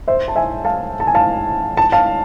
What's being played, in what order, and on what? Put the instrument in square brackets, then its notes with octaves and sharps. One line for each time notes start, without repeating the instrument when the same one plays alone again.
[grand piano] C5 E5
A5
E5 G#5
F5 A5
A5
G#5
F5 A5
A5
F5 A5